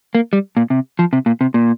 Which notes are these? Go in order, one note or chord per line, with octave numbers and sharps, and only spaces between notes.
A#3
G3
A#2
C3
F3
C3
A#2
C3
A#2